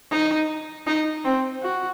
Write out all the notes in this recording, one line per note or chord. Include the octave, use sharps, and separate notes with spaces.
D#4
D#4
C4
F#4